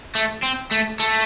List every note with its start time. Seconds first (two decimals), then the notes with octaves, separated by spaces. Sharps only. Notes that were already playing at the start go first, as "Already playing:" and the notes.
0.15 A3
0.43 C4
0.71 A3
1.00 A3